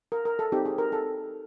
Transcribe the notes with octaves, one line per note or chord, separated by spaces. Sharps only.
A#4
A#4
A4
C4 D#4 G4
G#4
A#4
A4